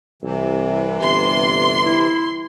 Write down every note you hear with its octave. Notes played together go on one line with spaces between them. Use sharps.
C2 C3 E3
G1 C6
E4